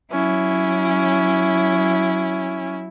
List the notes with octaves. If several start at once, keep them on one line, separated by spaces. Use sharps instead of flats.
F#3 C#4 E4